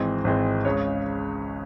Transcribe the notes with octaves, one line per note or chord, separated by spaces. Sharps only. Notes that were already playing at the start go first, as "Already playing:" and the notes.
Already playing: G#1 G#2 E3 G#3 C4 D#5
G#1 G#2 E3 G#3 C4
C#2 C#3 G#3 C#5